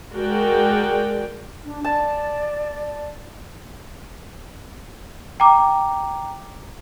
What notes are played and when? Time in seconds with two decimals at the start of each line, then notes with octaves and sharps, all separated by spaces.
0.14 G#3 F#4 A#4 D5 G5
1.64 D4
1.84 D5 A5
5.40 G5 A#5 D6